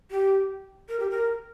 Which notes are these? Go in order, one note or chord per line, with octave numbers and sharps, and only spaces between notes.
G4
A#4
G4
A#4